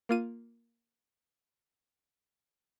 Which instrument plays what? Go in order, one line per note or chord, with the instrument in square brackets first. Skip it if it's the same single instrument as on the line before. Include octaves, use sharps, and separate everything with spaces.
[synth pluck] A#3 F4 D#7